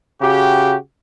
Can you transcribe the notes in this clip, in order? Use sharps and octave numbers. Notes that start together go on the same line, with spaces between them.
C#3 F#4 G4